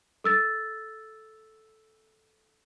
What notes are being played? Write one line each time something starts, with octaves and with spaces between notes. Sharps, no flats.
A4 E6 A6